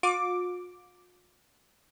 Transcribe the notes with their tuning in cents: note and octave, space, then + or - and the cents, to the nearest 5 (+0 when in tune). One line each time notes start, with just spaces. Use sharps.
F4 +45 D6 +0